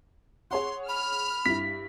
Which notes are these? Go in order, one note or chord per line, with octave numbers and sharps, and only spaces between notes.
G#4 C#5 F#5 C6
B5 F6
G2 E4 B6